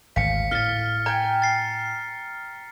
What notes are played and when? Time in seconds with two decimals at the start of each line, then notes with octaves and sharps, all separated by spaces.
0.16 G#1 D2 F5 B6 C#7
0.51 A2 F6 A6 G7
1.06 G5 G#5 A#5
1.42 A6 C7